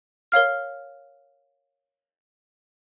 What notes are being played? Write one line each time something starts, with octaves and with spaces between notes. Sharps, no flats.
A#4 C#5 F5 F6